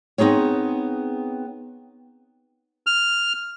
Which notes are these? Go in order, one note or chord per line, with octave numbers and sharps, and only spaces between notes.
B3 C4 D#4 G#4 C#5
F6